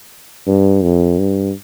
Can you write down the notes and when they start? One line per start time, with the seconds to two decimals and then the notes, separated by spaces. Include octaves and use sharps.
0.47 G2
0.83 F2
1.19 G2